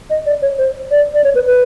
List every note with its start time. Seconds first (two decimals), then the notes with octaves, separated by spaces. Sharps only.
0.10 D#5
0.26 D5
0.42 C#5
0.58 C5
0.91 D5
1.13 D5
1.24 C#5
1.35 B4
1.45 B4